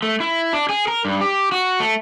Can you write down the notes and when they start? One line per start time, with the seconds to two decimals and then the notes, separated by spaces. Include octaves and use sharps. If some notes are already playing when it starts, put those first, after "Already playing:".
0.03 A3
0.20 E4
0.53 D4
0.69 G#4
0.88 A#4
1.05 G2
1.21 G4
1.52 F#4
1.80 A3